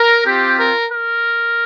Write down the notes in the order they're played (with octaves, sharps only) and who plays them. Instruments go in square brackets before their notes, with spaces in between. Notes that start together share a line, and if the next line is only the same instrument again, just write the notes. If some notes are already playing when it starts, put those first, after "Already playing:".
Already playing: [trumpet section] A#4
C4 F4 G4
A#4
A#4